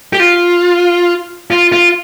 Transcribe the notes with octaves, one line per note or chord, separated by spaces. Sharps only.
G4
F4
F4
F4